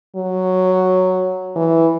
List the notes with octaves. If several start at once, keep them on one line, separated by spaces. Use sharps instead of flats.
F#3
E3